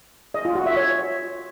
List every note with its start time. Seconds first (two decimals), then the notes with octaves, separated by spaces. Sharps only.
0.34 D#5
0.45 F4
0.55 F#4
0.66 E5
0.77 C#5